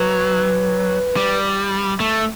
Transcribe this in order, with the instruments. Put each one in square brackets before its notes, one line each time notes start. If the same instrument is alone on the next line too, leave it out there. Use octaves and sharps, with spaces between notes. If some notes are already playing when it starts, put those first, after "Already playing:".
Already playing: [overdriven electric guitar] F#3 [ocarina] B4
[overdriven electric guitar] G3
A3